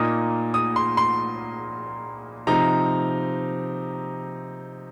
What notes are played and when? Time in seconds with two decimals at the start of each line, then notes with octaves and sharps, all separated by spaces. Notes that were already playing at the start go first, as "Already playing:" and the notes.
Already playing: A#2 A#3 D#4 D#6
0.54 D#6
0.76 C6
0.97 C6
2.47 C3 F3 C4 D#4 A#5